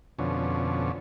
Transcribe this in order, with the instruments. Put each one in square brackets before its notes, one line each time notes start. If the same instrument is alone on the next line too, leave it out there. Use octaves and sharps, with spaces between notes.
[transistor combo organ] F2 B2 D3 C#4